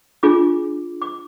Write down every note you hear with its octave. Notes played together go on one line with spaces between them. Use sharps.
D4 F4 G#4 D6
D6